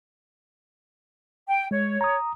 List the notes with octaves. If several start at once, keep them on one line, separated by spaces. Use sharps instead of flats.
G5
G#3 C#5
A#5 D#6